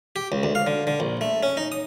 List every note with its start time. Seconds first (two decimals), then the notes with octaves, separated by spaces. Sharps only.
0.16 G4
0.32 C#2
0.43 D2
0.55 F5
0.67 D3
0.87 D3
1.00 A#1
1.21 A3
1.43 C#4
1.57 D#4
1.72 D#6